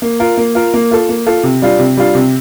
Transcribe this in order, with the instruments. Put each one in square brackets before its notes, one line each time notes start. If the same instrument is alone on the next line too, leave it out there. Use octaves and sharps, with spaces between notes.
[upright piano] A#3
F4 A#4
A#3
F4 A#4
A#3
F4 A4
A#3
F4 A4
C3
G3 D4 F4
C3
G3 D4 F4
C3